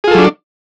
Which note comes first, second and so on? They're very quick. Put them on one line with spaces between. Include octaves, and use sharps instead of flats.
G#4 F4 A4 F#3 D4